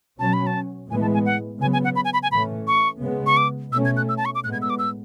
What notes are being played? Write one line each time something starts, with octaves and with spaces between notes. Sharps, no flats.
B2 F#3 C#4 A5
B5
A5
A2 E3 G#3 B3 G#5
A5
G#5
F#5
C#3 F#3 B3 G#5
G#5
F#5
B5
G#5
B5
G#5
A2 E3 A3 C#4 B5
C#6
C#3 G#3 B3
C#6
D6
B2 A3 C#4 E6
G#6
F#6
E6
A5
C#6
D6
A2 G#3 B3 F#6
G#6
E6
D6
E6